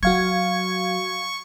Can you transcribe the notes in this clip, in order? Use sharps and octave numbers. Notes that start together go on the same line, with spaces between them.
F#3 F#4 F5 C#6 G#6